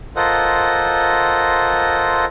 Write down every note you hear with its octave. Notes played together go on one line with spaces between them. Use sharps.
F4 A4 A#4 C5 D#5 F#5